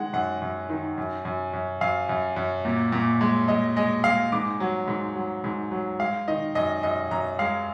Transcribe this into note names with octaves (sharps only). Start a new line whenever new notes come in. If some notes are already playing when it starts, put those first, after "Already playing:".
Already playing: D#3 G#3 F#5
F#2 F#5
F#2
D#3
F#2
F#2
F#2
F#2 F5
F#2
F#2
A#2
A#2
G#3
G#3 D#5
G#3 D#5
G#3 F5
G#2 D6
F#3
G#2
F#3
G#2
F#3
G#3 F5
D#3 D#5
F#2 D#5
F#2 D#5
F#2 A#5
G#3 F5